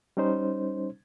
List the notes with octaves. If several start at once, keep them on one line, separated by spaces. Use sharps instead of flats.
G3 C#4 D#4 C5